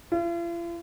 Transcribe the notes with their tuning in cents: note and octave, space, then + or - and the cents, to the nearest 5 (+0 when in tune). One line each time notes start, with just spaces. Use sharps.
F4 -45